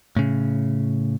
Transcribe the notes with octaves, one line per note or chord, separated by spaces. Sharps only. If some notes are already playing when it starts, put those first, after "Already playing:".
A2 C#3